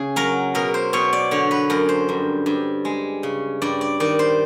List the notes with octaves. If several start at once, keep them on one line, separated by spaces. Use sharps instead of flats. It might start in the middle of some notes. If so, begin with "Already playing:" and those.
Already playing: C#3 G#4
F#3 A#4
B2 A#4
C5
B2 C#5
D5
D3 C#5
B4
F#2 A#4
C5
G2
G2
G#3
C#3
G2 D5
D5
D#3 D5
C5